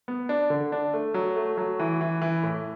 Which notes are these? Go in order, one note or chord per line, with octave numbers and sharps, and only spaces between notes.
B3
D4
D3
D4
A3
F#3
A3
F#3
E3
E3
E3
A2